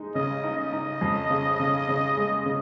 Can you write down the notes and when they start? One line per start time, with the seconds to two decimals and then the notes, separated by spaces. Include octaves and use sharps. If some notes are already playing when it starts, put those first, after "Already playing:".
Already playing: G#3 D#4
0.15 C#3 D#5
0.44 D#4
0.58 D#5
0.73 D#4
1.01 F2
1.30 C#3
1.59 C#3
1.88 C#3
2.17 G#3
2.46 C#3